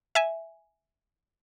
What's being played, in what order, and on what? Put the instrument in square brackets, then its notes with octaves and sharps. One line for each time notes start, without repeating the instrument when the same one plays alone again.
[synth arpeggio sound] E5 G#5